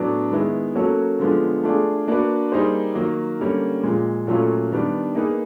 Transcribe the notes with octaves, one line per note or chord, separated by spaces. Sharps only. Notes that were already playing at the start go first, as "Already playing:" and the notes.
Already playing: A2 F#3 B3 D4 F#4
D#3 G#3 B3 E4
F#3 A#3 C#4 F#4 A4
D3 F3 G#3 B3
A3 D4 F4 G#4
A#3 D4 F#4 B4
G3 A#3 D#4 G#4 C5
D#3 F#3 A#3
D3 G3 A#3 C#4
A#2 F3 G#3
A#2 F#3 A3 C#4 F4
D#3 G3 B3 D4
A#3 D#4 G#4 B4